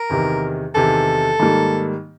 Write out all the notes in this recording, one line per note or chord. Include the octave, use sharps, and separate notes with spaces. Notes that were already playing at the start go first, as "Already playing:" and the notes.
Already playing: A#4
E2 C3 D#3
E2 C3 D#3 A4
G#2 D#3 G3 A#3